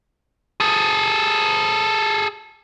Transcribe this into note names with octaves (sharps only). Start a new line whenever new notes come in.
G#4 A4